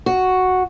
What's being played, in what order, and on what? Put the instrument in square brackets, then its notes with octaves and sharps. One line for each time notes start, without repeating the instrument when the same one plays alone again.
[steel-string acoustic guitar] F#4